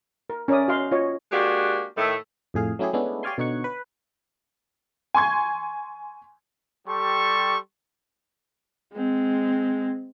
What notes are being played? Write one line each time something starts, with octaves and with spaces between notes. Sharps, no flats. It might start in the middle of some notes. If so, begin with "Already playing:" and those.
A#4
C#4 A#4 C#5 D5 E5 D#6
F#4 D#5 F5 C6
F4 C#5 D#5
G#3 A#3 D4 F#4 G4
A2 D#3 A3
F2 A2 G#4 F5
F#3 A3 C#4 E4 G4 G#4
G#3 A3 B3 C#4 D4 E4
G4 C#5 D5 F5 G#5 C6
B2 D3 D#4 C#5 F#5 C#6
B4
G#5 C6 C#6 G#6
G3 G4 A4 C6 C#6
G#3 C4